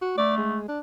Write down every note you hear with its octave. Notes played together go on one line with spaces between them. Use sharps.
F#4
A3 D5
G#3
D4